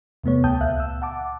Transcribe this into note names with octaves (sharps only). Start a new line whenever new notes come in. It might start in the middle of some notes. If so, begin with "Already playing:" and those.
E2 C3 A3 B3 C#5
D2 G5 A5 D#6 G6
C#2 A#2 E5 F5 F#6
E6
F#5 A5 D6